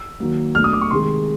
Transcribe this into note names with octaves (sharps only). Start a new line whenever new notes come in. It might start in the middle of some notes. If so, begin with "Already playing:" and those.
Already playing: E6
D#3 F#3 A#3
B2 F#3 A3 D4 F6
D#6
D6
C#6
C3 D#3 G#3 C6